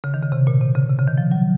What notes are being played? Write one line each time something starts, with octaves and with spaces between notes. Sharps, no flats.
C#3
D#3
C#3
C3
A#2
C3
C#3
C3
C#3
D#3
F3
F#3